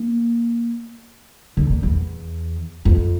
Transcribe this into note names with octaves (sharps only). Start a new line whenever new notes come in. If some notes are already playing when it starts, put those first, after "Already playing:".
Already playing: A#3
D3
A#2
E2
F2